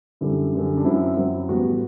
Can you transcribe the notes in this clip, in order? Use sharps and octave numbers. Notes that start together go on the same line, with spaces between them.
F#2 D3 G3 E4
F#2 D3 G3
D4
F#2 F#3 C4 E4
F#2 F#3 C4
A1 A2 G3 B3 F#4